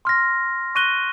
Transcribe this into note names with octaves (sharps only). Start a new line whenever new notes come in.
C6 F6 A#6
C#6 F#6 A#6 D#7 G7